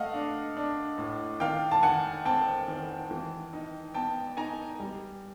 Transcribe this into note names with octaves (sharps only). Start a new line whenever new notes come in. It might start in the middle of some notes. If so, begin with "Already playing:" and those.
Already playing: A3 D#5 F5 F#5
D4
D4
A2
D#3 F5 G5
A5
D#3 F#5 G#5
C4 G5 A5
D#3
E3
D#4
B3 G5 A5
D#4 G#5 A#5
G3